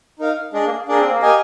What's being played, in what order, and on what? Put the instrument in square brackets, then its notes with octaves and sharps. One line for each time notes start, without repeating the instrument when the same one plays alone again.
[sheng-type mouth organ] D#4 A#4 F5
[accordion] G#3 [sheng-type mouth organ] D4 G#4 D5
[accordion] A#3
[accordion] A#3 [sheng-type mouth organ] D4 G#4 D5
[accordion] C4
A#3
[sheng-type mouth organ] G4 A#4 D#5 G#5